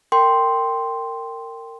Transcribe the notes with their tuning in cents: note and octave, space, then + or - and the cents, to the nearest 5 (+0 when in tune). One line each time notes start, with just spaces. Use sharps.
A#4 -25 G5 +0 C6 +0